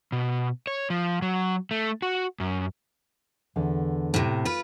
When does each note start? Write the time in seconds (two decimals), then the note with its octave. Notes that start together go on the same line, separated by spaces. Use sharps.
0.12 B2
0.67 C#5
0.90 F3
1.22 F#3
1.71 A3
2.02 F#4
2.40 F#2
3.56 E2 D3
4.14 A2 C3
4.45 F4 B4